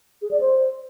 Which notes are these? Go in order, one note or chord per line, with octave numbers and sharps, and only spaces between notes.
G#4
D5
C5